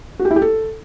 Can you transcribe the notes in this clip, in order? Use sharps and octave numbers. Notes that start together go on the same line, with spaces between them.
F#4
G4
E4
G4
A4